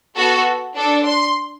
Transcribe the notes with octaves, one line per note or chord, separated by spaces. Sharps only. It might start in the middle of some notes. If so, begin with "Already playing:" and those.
B3 F#4 A4
D4 A4
C6